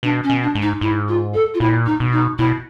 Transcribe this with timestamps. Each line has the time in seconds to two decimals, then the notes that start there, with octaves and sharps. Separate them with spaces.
0.03 B2 D4
0.24 C#4
0.30 B2
0.42 D4
0.55 G#2
0.62 D#4
0.81 G#2 E4
1.08 F4
1.34 A4
1.54 F4
1.60 A#2 E4
1.86 D#4
2.00 B2
2.13 D#4
2.38 B2 E4